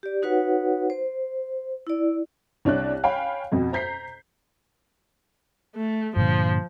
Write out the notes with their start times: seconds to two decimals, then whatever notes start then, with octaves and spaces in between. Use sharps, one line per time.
0.03 G4 D5
0.22 D#4 F#4 B4 C#5 F#5
0.90 C5
1.87 E4 D5
2.65 C2 D4 C#5 D5 F#6
3.03 C#5 F5 G5 G#5 B5
3.52 F2 B2
3.72 C5 A#5 G6 B6 C7
5.75 A3
6.16 G2 A#2 D3 F3